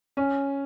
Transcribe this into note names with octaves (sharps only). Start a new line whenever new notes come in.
C#4